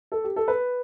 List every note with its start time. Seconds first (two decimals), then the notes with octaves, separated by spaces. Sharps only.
0.12 A4
0.24 G4
0.36 A4
0.48 B4